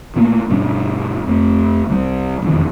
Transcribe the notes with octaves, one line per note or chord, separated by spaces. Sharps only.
A#2 A3 A#3
G2 B2 G3 C#4
F2 A3
C2 G3
E1 F2 D#3